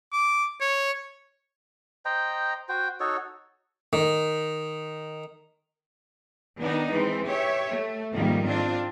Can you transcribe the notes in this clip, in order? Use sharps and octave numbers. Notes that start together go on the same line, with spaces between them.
D6
C#5
C5 D#5 G5 A#5
F#4 C5 G5
D#4 F#4 A4 C#5
D#3
D#3 B3 D4 D#4
E3 G#3 C4
G4 C#5 E5
A3
F2 G#2 D#3 F3 G3 A#3
C4 D4 F4